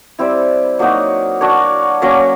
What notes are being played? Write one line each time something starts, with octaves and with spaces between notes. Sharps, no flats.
G3 C4 E4
F#3 A#3 D#4 F#4
D4 F#4 A#4 C#5
F#3 A#3 C#4